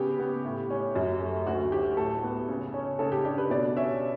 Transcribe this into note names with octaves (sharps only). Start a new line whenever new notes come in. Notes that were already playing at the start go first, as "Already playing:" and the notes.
Already playing: C#3 B3 G4
B3
A2
C#4
F#2
A3
D2 F#4
F#3 G4
A2 A4
B3
C#3
C#4
C#3 A4
G4
D4 G4
B4
B2 D5
C#4 E5